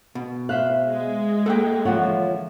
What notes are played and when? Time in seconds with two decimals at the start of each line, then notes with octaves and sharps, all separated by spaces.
0.15 B2
0.49 C5 E5 F5 F#6
0.87 G#3
1.46 A#3 A4 F#5 G5
1.85 D3 E3 F3 F4 C#5 F#5